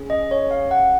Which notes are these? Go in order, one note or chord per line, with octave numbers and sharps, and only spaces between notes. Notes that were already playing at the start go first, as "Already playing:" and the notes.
Already playing: C#4 G#4
D#5
C#5
F5
F#5